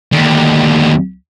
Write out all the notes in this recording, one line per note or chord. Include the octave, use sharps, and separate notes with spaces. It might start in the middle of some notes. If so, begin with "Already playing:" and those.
D#2 D3